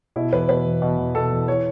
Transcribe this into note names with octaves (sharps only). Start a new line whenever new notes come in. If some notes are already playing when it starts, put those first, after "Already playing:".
B2 E4
E2 B4
B2 B4
E2
B2
E2
B2 A4
E2
E3 C#5